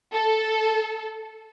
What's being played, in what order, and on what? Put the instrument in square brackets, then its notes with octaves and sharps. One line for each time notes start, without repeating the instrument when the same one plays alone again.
[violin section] A4